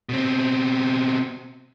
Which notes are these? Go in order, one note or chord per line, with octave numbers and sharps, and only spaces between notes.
B2 C4